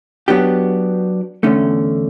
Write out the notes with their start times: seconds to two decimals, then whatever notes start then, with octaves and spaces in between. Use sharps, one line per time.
0.28 F#3 B3 D4 G4
1.43 E2 D3 A3 C#4